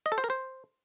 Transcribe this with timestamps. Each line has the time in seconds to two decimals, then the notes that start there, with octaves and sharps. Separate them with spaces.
0.06 D#5
0.12 A4
0.18 C5
0.24 A#4
0.30 C5